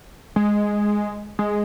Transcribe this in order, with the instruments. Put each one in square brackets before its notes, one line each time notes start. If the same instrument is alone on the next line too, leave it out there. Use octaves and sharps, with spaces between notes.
[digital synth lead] G#3
G#3